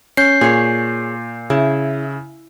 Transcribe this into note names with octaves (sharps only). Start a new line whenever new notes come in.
C#4 G6 C7
A#2 G#4 C#5
C#3 E4